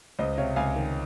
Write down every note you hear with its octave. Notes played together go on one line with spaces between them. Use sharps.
C#2 C5 D#5
C3 C#5 F5
C#2 F5 G#5
D#3